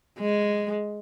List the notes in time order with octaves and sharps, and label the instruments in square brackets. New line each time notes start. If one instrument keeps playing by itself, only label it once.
[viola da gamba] G#3